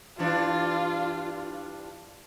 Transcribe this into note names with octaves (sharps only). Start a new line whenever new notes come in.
G2 E3 D4 F4